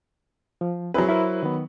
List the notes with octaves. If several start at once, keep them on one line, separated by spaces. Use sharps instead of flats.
F3
F#3 C4 E4 G#4 B4
E4 A#4 C5
D#3 B3